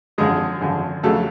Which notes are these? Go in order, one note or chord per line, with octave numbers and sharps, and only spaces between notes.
G#1 F#2 D3 F3 G#3 G#4
G#1 F#2 D3 F3
F2 C#3 F#3 A3 A4